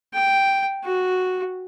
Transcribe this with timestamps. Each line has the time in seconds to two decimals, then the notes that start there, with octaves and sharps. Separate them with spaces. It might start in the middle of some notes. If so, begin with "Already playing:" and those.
0.14 G5
0.84 F#4